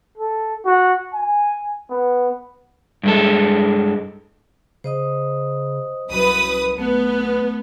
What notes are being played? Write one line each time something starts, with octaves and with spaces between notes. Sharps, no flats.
A4
F#4
G#5
B3
G2 G#3 A4
C#3 C5 D#5 D#6
C2 F#2 B4 D#6
B1 A3 B3